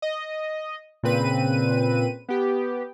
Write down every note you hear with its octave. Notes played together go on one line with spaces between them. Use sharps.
D#5
A#2 C#3 C4 B4 D#7
B3 G4